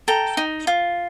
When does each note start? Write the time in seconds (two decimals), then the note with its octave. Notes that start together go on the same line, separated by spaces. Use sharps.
0.08 A4 G5 A#5
0.37 D#4
0.67 F4